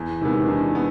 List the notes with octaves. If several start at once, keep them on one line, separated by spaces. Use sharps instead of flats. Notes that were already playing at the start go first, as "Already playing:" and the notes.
Already playing: E2
C3 D#3 G#3 B3 D#4
E2 D4
B3